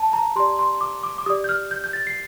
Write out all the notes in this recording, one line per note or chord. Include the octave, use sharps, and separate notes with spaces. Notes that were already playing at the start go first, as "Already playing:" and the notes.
Already playing: A5
A#5
G4 D5 C6
C6
D6
D6
D6
G4 D5 D#6
G6
F6
G6
G6
A6
C7